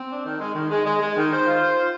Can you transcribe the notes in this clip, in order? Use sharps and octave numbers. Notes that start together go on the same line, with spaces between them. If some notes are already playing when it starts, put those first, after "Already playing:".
Already playing: C4
D4
D#3
G#3
D#3
G#3
G#3
G#3
D#3
C5
F4
C5
F4